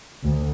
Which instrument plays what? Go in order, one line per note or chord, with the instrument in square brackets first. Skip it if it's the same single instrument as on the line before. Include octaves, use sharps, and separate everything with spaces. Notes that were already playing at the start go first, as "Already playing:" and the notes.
[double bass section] D2